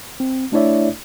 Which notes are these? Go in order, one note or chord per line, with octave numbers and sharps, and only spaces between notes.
C4
A3 D4 E4 C#5 D5 E5